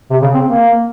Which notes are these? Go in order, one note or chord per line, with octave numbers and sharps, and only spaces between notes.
C3
C#3
C4
A#3